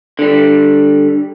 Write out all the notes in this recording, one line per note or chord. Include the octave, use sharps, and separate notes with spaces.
D3 G3